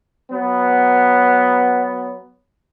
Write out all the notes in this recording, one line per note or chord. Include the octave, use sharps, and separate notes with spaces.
F#3 B3